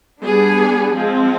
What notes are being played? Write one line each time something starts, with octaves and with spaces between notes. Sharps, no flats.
G3 B3 D4 G#4
F3 G#3 C4